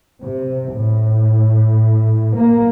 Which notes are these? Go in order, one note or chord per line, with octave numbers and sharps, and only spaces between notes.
C3
A2
A#3